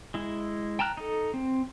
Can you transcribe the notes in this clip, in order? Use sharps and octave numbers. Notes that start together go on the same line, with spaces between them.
G#3 E4
G5 A5 A#5 F6 F#6
D#4 A4
C4